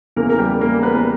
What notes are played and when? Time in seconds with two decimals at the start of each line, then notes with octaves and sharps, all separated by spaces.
0.16 E2 C#3 E3 A#3 A#4
0.30 A#4
0.38 G3 G4
0.61 A#3 A#4
0.82 B3 B4
0.96 B4